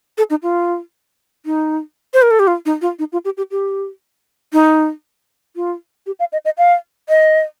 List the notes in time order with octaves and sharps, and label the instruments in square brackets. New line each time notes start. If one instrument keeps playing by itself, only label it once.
[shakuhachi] A4
D#4
F4
D#4
C5
A#4
A4
G4
F4
D#4
F4
D#4
F4
G4
G4
G4
D#4
F4
G4
F5
D#5
D#5
F5
D#5